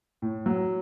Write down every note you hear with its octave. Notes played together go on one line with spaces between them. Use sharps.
A2
F#3